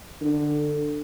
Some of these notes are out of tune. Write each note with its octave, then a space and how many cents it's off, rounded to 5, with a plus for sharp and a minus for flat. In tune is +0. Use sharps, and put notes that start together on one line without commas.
D3 +15